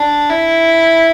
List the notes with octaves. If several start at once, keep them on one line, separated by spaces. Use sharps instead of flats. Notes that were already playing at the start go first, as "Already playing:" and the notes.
Already playing: D4
E4